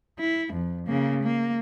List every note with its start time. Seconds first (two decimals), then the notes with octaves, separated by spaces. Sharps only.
0.20 E4
0.53 F2
0.87 C#3 A#3
1.23 A#3